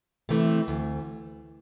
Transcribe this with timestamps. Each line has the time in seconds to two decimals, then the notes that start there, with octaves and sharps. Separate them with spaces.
0.29 C3 E3 A3
0.68 D2